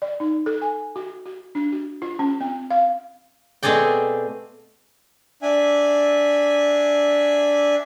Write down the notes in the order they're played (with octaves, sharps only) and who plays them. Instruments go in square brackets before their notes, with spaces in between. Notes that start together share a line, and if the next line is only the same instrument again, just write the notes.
[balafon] D5
D#4
A4
G#5
F#4
F#4
D4
F#4
F4
C#4
C4
F5
[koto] B2 A3 C4 G#4 D5 G5
[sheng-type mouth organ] D4 E5 G#5